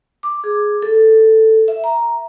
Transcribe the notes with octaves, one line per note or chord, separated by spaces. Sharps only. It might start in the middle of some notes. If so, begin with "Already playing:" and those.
D6
G#4
A4
E5
A#5